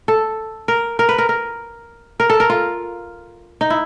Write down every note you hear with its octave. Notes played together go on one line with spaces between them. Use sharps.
A4
A#4
A#4
B4
A#4
A#4
A#4
A4
A#4
F4
D#4
E4